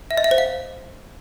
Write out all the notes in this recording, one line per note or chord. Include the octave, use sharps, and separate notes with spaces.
E5
D#5
E5
C5
F5